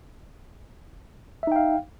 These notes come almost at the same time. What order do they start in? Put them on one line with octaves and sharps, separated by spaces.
E5 D#4 G5 F5